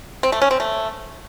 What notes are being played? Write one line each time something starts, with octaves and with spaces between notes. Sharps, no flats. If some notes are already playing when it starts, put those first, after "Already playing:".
C4
A3
C#4
C4
A3